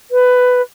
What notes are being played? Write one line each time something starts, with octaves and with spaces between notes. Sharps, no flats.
B4